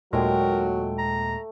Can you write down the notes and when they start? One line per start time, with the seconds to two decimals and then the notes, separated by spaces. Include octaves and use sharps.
0.13 D#2 A#2 F#3 G#3 A3 A#4 G5
0.98 A#5